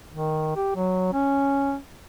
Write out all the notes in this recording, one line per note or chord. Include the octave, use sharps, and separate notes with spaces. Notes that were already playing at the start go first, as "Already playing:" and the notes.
D#3
G4
F#3
C#4